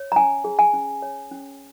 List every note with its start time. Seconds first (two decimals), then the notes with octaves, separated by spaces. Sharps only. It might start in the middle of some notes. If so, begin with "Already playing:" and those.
Already playing: C#5
0.12 A#5
0.16 C#4 G#5
0.44 G#4
0.59 G#5
0.73 C#4
1.02 C#5
1.31 C#4